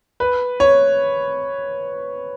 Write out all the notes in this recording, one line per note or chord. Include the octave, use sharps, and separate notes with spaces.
B4
C#5